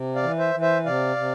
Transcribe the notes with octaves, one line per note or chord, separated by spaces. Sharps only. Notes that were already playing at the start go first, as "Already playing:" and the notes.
Already playing: C3
D5 F5
E3
C5 E5
E3
C5 E5
C3 D5 F5
C3